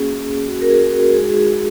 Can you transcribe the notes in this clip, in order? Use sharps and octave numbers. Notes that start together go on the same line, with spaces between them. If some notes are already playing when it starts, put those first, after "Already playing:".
Already playing: A#3 C#4 F#4 G#4
F#4
A#4
G#4
F#4
G#3 D#4 F#4 G#4
G#4